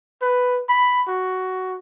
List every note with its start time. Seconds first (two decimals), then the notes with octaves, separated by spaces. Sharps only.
0.22 B4
0.69 B5
1.08 F#4